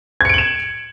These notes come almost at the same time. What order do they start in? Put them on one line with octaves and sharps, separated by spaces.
G#6 C#7 D7 F#7 E7